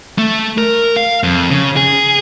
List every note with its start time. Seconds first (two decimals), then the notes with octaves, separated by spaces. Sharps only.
0.18 A3
0.58 A#4
0.96 F5
1.23 F2
1.50 C#3
1.76 G#4